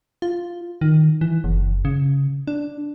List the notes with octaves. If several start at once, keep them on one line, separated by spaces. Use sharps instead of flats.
F4
D#3
E3
F#1
C#3
D4